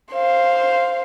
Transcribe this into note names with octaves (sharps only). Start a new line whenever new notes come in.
C5 F5